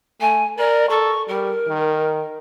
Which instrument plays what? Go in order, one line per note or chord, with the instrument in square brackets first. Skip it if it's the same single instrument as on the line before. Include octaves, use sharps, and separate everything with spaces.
[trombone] A3 [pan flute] G#5
[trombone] A#4 [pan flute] D5
[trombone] A4 [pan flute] C#6
[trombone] G3 [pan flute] A#4
[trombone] D#3